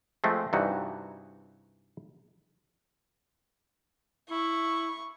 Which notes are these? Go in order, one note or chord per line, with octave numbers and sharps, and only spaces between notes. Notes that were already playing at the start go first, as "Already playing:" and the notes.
F3 G#3 A3 C4
G2 C3 E3 D#4 F#4
E4 C#6